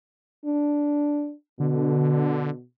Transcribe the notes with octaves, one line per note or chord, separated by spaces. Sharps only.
D4
B2 D3